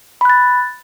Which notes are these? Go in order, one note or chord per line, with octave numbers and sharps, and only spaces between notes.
B5 F#6 A6